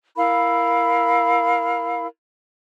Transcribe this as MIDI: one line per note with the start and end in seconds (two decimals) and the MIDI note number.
0.16 2.07 64
0.16 2.07 70
0.16 2.07 77
0.16 2.07 83